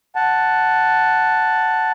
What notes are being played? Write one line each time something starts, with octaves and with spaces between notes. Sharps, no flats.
F#5 A5